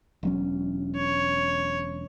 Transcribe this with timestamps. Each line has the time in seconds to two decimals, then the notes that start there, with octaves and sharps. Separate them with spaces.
0.23 E1 F#3 C#4
0.96 C#5